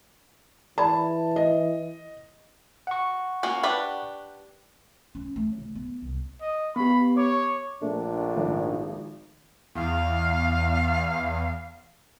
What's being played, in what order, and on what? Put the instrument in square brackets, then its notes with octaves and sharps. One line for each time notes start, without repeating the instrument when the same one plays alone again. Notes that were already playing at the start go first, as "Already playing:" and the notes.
[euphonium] E3 [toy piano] G#4 D5 B5 [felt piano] A5
[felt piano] D#5
[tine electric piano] F#5 C#6
[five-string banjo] A#3 C#4 F#4
D4 G4 B4
[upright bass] C#4
A3
C#3
B3
C2
[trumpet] D#5
[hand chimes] B3 G4 [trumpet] B5
[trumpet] C#5 [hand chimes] D6
[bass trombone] A#1 [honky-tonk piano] A3 [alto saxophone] D4
[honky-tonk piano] G#1 F3 A3
[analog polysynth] E2 [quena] F5